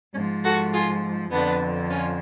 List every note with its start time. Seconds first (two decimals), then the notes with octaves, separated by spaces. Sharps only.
0.14 G#2 C#4
0.19 F3
0.43 F#4 A4
0.73 F4 G#4
1.30 F2 D3 F3 B3 D4
1.89 C#4 F4